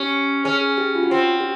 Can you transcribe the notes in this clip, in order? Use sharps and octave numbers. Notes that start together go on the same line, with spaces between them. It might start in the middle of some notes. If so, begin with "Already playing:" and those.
Already playing: C#4 G4
C#4 G#4
G#4
G4
F4
F#4
C4
G4